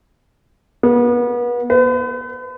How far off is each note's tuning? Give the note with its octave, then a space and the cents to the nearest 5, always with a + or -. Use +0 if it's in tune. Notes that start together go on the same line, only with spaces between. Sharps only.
B3 -35
B4 +40